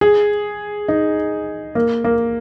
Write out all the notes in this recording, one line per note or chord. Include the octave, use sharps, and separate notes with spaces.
G#4
D#4
A#3
A#3